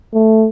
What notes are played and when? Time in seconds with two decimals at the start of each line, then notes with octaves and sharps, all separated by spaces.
0.14 A3